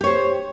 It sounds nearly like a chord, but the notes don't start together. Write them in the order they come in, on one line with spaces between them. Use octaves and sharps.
G4 C#5 C5